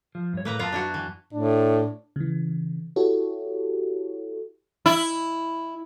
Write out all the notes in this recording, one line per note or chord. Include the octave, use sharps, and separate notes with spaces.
F3
G2 C#5
A2 A3 A#3 B4 A#5
F#2 B3 F4 A5 A#5
D4 E4 F#4
E3
A2 D4
C#3 E3
E4 F#4 G4 A4 C#5
E4